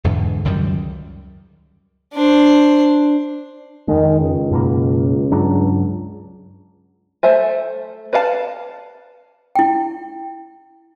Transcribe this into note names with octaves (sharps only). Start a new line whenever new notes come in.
E2 G#2 D3
C#2 F#2 D#3 G3
D4 C5
F2 D#3 G#3
C#2
F#2 B2 A#3
G2 F#3 D4
A3 C5 E5 G#5
B4 D5 F5 F#5 A5
E4 G5